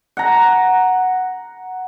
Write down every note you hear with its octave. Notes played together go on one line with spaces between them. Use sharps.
F#5 A#5